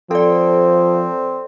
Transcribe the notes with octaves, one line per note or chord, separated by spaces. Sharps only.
F3 C4 A4 D5